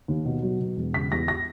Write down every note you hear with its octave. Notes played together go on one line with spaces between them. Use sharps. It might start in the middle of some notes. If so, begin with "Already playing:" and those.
D#2
B2
F#3
B2
E1
C#3 B6
E2 A#6
A#6